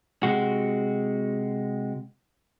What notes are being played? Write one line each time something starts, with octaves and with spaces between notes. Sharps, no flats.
C3 G#3 F#4